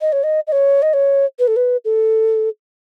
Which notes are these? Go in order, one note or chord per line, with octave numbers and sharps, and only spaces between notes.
D#5
C#5
D#5
D#5
C#5
D#5
C#5
B4
A4
B4
A4